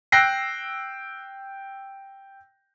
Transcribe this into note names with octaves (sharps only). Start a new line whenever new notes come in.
G5 E6 F#6 A#6 C7